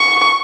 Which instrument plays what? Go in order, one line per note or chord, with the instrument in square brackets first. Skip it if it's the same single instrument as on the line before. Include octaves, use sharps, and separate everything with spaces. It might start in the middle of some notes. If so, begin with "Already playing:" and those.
Already playing: [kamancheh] C#6